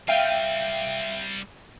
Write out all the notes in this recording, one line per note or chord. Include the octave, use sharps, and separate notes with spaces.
G3 C4 E5 F5 G5 D#7